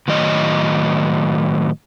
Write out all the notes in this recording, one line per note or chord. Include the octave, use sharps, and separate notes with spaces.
A2 D#3 F#3 D#5